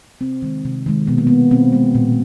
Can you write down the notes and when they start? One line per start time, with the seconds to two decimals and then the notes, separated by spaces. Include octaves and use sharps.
0.21 C3 C4
0.42 D#3 G#3
0.65 C3
0.86 D#3 G#3
1.07 B2 B3
1.18 A#3
1.27 G#3 B3
1.51 B2 C4
1.73 G#3
1.95 A#2